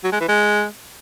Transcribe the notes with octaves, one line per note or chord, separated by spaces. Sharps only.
F#3
G#3
E3
G#3